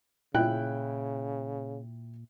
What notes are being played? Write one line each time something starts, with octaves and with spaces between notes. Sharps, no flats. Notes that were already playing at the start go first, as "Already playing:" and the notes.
A#2 C#3 E4 G5 F#6